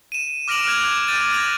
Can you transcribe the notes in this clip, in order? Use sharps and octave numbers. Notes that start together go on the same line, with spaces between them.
D#7 E7
D6 F6 A#6 D7 F7 F#7
F#6 G#6 F7
G6 A6 D#7 F7
F#6 G#6 A#6 D#7 F7 F#7